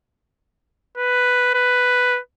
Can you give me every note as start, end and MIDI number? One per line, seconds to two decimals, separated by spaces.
0.97 1.51 71
1.55 2.20 71